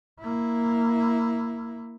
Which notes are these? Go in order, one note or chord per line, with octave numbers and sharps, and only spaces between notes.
A#3 E4